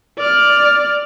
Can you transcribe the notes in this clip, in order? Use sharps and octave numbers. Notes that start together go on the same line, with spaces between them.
D5 F6